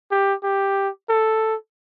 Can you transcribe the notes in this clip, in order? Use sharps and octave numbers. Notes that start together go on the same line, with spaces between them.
G4
G4
A4